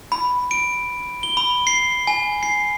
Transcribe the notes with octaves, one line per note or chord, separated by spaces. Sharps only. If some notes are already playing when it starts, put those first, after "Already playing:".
B5
D7
G7
B5
C7
G#5
C7